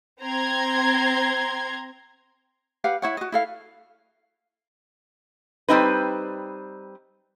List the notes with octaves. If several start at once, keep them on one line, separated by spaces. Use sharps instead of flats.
C4 A#5 C6 G#6
G4 B4 F5 F#5
E4 C#5 F#5
F#4 D#5
E4 A4 F5
G3 C4 D#4 B4